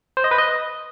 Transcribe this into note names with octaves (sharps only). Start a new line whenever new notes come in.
C5
D#5
B4
D#5